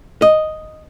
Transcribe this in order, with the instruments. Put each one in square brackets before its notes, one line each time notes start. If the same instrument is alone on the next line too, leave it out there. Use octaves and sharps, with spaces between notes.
[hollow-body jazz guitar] D#5